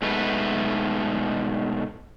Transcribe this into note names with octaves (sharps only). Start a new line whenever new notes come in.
G#2 B2 A3 B4